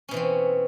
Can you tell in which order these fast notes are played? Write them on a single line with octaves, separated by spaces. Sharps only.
C#4 B2 E3 C4